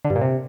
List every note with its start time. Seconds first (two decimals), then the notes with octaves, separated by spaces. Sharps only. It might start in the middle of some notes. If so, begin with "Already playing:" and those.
0.05 D3
0.10 G2
0.16 A#2
0.21 C3